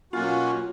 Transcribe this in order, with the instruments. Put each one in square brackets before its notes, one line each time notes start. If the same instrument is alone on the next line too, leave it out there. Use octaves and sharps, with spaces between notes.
[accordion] B2 F#3 A#3 C#4 F#4 [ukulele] F4